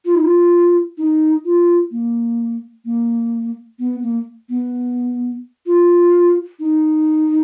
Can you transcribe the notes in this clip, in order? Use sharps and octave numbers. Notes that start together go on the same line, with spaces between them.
F4
D#4
F4
D#4
F4
A#3
A#3
B3
A#3
B3
F4
D#4